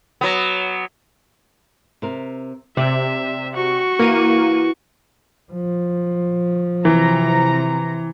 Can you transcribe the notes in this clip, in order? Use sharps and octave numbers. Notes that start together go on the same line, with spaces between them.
F#3 B3
C3 A#4
C3 D5 E5
F#4 C#6
E3 A#3 D#7
F3
C3 E3 A#5